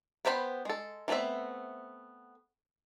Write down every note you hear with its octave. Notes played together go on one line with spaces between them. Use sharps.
B3 G4 C5 F#5 B5
G#3 A4
E3 A3 B3 C4 E5